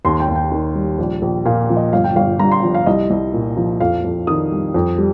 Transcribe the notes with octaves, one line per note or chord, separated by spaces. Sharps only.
D#2 C6
G5
D#2
G5
D#3
G3
A#1
A#1
A#2 F5
F3
D#5
G1 F5
G5
G1 F5
G2 A#5
C6
F3
F5
C2 D#5
C2
A#2
F3
F2 F5
F2
D#3 D#6
G3
F2
G3